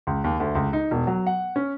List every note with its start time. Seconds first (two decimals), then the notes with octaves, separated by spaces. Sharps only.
0.07 C#2
0.24 D#2
0.40 D2
0.55 C#2
0.73 D#4
0.91 E1
1.07 F#3
1.27 F#5
1.56 C#4